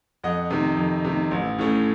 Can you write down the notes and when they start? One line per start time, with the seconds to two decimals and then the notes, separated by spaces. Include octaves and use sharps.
0.24 F2 D#5 F#5
0.51 C3 D#3
0.77 F2
1.05 C3 D#3
1.31 A1
1.59 A2 A3 C#4